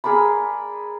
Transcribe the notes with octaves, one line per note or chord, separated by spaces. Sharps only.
G#4 A#4 D5 B5